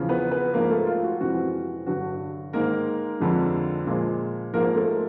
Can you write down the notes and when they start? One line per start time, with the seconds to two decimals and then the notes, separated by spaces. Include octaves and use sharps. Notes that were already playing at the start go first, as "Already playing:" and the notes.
Already playing: E2 C#3 F3
0.09 B3 B4
0.31 B3 B4
0.54 G#2 F3 G#3 A#3 A#4
0.70 A3 A4
0.87 F4
1.04 F#4
1.20 F2 C3 E3 G#3 F#4
1.87 G2 D3 F#3 F#4
2.53 G#2 D#3 G#3 A#3 A#4
3.20 F2 D3 F3 G#3
3.87 A#2 F3 G#3
4.53 G#2 F3 G#3 A#3 A#4
4.75 A3 A4